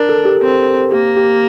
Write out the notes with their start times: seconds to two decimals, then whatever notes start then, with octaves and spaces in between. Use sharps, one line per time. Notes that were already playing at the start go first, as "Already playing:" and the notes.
Already playing: D4 A#4
0.09 A4
0.25 G4
0.42 C4
0.92 A#3 G4
1.17 G4